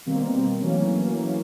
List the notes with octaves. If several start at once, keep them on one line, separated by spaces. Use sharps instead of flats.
B2 D#3 G3 A#3 C4
E3 F#3 A3 A#3 C#4